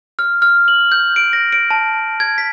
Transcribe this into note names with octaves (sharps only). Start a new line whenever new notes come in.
F6
F6
F#7
G6
D7
A#6
D7
A5
G#6
B6